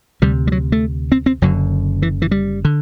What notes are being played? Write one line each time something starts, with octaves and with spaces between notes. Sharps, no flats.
D2 C3 G3
G3
F#3
A3
C4
C4
F#1 F#2 D3 F#3
E3
E3
G3
D3